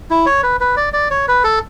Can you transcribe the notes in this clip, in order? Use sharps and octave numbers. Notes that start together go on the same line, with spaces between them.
E4
C#5
B4
B4
D5
D5
C#5
B4
A4